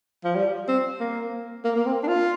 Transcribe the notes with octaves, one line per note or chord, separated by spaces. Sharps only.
F3
G3
C4
A#3
A#3
A#3
C4
D4
F4